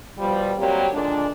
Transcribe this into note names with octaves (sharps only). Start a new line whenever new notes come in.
B2 F3 G3
F#3 G3 A#3 C4 G4
A#2 D3 G#3 D4